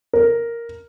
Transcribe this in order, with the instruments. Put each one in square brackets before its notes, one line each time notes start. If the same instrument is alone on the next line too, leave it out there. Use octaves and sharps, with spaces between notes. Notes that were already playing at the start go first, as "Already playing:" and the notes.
[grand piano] A#4